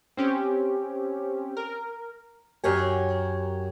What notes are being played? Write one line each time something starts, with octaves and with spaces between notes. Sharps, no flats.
C4 C#4 G4
A#4
F#2 G4 C#5 G#5